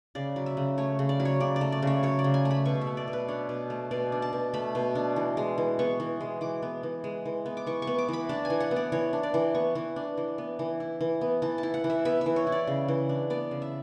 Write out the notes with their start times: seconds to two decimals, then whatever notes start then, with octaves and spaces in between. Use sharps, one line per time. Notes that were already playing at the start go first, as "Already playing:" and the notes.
0.15 C#3 D5
0.36 F#3
0.46 E5
0.57 C#3
0.78 A3 C#5
0.99 C#3
1.09 D5
1.20 F#3
1.25 C#5
1.40 C#3 D5
1.56 D5
1.61 A3
1.72 D5
1.82 C#3 C#5
2.03 F#3 C#5
2.19 D5
2.24 C#3
2.34 G#5
2.45 A3
2.51 B5
2.65 B2 C#6
2.81 E5
2.87 A3
2.97 D5
3.08 B2
3.13 B4
3.28 D4 C#5
3.49 B2
3.70 A3
3.91 B2 D5
4.12 D4
4.22 A5
4.33 B2
4.54 A3 B5
4.75 B2
4.95 D4
5.16 E3
5.37 G#3
5.58 E3
5.79 B3 C#6
6.00 E3
6.21 G#3
6.41 E3 D6
6.62 B3
6.83 E3
7.04 G#3
7.26 E3
7.46 B3
7.57 D6
7.67 E3 C#6
7.82 C#6
7.87 B3
7.98 D6
8.08 E3 B5
8.29 D4 A5
8.45 G#5
8.50 E3
8.60 F#5
8.71 B3
8.76 D5
8.92 E3 C#5
9.13 D4
9.23 D5
9.34 E3
9.54 B3 C#6
9.75 E3
9.96 D4
10.17 E3
10.38 B3
10.59 E3
10.80 E4
11.01 E3
11.21 B3
11.42 E3 A5
11.58 A5
11.63 E4
11.74 F#5
11.84 E3
11.90 E5
12.05 B3 E5
12.21 E3 E5
12.36 C#5
12.47 E4
12.52 D5
12.67 C#3
12.88 E3
13.09 D4
13.30 B3 D5
13.51 C#3
13.62 E5